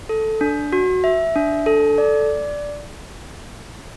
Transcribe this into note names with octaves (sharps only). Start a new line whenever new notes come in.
A4
D4
F#4
E5
D4
A4
D5